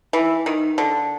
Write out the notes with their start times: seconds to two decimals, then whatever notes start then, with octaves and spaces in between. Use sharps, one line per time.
0.13 E3
0.46 D#3
0.78 D3